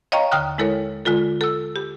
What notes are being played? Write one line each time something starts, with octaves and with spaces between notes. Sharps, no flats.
C#5 D#5 F5 G5 A#5 C#6
D#2 D3 G5 D#6 F6 F#6
G#3 E4 A4 A#4 C#5
D3 G#3 F4 A4
A4 E6
G4